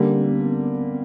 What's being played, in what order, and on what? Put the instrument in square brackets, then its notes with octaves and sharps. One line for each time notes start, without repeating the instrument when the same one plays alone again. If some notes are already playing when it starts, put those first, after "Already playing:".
Already playing: [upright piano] D3 G3 A#3 [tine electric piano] C#4
[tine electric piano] C4
B3
B3